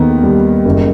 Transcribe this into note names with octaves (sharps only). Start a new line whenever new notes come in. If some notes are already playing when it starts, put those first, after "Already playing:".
Already playing: D#2 D#3 B3
G3
F#1